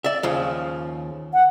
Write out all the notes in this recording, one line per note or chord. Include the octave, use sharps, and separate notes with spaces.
D5 E5
D#2 C#3 F3
F#5